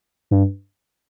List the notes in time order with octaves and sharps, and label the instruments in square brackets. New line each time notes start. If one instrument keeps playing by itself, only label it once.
[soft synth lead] G2